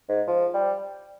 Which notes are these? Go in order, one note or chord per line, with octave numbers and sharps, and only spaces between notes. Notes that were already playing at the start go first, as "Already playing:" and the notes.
G#2
F3
G3